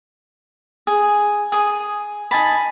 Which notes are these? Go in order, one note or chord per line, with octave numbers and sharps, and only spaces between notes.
G#4
G#4 D#6
D#4 G#5 A5 B5